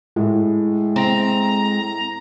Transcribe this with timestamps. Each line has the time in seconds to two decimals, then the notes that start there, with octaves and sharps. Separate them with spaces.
0.16 A2 G#3
0.96 C4 A#5